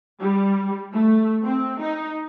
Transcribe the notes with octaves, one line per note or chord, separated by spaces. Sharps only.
G3
A3
C4
D#4